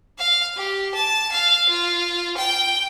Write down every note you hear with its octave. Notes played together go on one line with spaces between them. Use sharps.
F5
G4
A5
F5
F4
G5